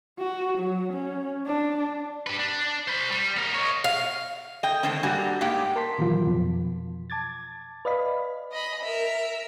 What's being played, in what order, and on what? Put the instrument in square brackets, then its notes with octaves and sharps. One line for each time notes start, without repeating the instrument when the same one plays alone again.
[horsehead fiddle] F#4
F#3
C#4
D4
[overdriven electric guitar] G4 B4
D4
C5 B5
G3
B3 A#4
C#5 D#5
[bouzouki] F5
[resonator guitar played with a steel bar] D#5 G5
D3 D#3 G#3 A3 C4 C#4
G2 G3 A#3 F#4 G#5
G#2 A#3 G4 G5
[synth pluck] A#4 A5 C6 B6
A#2 D#3 E3 F#3 F4
F2 B2 F3
A5 D6 G#6 A6
B4 D5 D#5 F5 B5
[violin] D#5 B5
A#4 E5